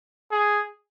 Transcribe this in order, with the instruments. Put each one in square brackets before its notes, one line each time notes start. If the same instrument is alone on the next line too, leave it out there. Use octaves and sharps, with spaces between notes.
[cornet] G#4